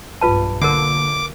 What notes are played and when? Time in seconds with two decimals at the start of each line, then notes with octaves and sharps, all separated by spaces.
0.21 B1 G2 F4 B4 A5
0.62 D3 A#3 A#4 F#5 D6